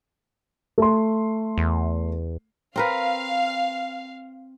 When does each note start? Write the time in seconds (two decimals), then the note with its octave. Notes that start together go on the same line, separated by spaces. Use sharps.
0.78 A3 C6
1.58 E2
2.76 C4 A#4 B4 F5